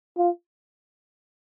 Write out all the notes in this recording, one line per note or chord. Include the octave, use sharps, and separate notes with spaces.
F4